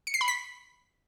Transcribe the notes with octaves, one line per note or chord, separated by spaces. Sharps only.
C#7
C7
B5
B6